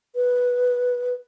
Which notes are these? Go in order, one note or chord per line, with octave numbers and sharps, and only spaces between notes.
B4